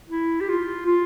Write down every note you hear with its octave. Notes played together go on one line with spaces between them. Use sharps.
E4
G4
F4
F4